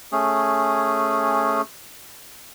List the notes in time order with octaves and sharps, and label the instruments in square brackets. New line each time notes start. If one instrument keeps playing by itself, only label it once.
[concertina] A3 C#4 G#4